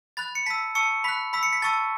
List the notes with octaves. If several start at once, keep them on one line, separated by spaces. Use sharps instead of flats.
B5 F#6 A6
C#7
A5 E6 B6
A5 C#6 E6 C#7
B5 F#6 B6
B5 E6 B6
C#7
B6
A5 C#6 E6 A6